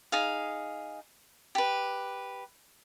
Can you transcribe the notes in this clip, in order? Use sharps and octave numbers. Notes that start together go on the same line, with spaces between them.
D#4 G#4 F5
G4 B4